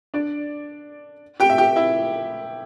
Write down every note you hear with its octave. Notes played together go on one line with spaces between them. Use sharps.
D4 D5
G4 G5
E5
G4 G5
E4 E5